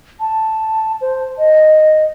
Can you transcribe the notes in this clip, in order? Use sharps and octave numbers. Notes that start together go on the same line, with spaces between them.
A5
C5
D#5